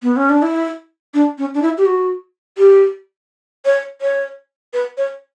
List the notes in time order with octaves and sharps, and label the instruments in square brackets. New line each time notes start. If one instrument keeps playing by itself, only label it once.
[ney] B3
C#4
D4
E4
D4
C#4
D4
E4
G4
F#4
G4
C#5
C#5
B4
C#5